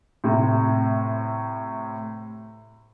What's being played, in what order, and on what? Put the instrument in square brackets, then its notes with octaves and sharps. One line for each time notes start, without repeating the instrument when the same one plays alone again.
[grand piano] A2 C3